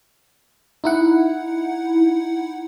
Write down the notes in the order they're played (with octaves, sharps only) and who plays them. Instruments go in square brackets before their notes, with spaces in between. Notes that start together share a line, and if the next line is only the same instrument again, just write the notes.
[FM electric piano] D#4 E4 F#5